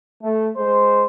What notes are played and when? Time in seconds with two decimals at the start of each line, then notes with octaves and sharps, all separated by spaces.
0.23 A3
0.57 G#3 C5